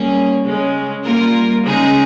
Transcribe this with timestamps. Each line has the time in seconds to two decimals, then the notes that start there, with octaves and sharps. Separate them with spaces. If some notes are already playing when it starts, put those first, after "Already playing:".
Already playing: G3 A#3 C#4 G#4
0.44 C#3 G#3 C#4
1.04 G3 A#3 F4 A#4
1.63 C#3 G#3 D#4 G#4